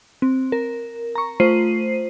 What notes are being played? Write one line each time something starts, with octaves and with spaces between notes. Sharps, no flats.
C4
A#4
A#5 C#6
A3 F4 C5 C7 D#7